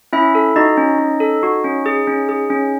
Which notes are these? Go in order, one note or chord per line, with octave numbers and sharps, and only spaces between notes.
C#4 E4 E5
A4
D#4 F#4 D#5
C#4
C#4
A4
F#4
C#4
G#4
C#4
G#4
C#4